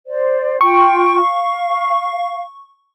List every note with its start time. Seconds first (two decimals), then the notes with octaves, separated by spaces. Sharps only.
0.06 C5 D5
0.61 F4 G5 C#6
1.19 F5